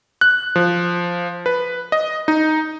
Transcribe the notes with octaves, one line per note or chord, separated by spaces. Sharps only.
F#6
F3
B4
D#5
D#4